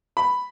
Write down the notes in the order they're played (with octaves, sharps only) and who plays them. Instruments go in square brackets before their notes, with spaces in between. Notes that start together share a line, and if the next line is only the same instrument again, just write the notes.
[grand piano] B5